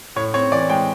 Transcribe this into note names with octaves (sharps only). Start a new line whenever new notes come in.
A2 C#5
C4 C#5
E3 D5
G#3 G5